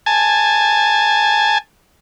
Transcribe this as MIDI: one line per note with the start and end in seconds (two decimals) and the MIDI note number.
0.06 1.58 80
0.06 1.58 81